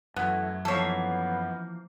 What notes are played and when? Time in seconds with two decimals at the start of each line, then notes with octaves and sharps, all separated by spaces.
0.16 F#2 E3 A3 B3
0.65 E3 F3 A#3 B3 A4 C#5